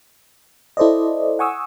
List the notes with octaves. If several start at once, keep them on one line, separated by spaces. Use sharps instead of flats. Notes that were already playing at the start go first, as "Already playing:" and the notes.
E4 A4 C5 D5 D#5
F#5 G#5 C#6 D#6 E6